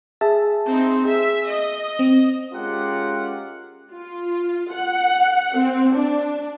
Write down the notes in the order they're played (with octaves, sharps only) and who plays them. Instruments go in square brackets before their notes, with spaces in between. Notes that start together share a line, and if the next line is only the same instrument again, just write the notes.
[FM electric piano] G#4 E5 A5
[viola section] C4 D#4
[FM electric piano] G#4 [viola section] E5
[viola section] D#5
[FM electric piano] C4
[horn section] G#3 C#4 F4 G4 A#4 F#5
[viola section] F4
F#5
C4
D4